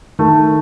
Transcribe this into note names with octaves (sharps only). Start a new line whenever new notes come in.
D#3 A3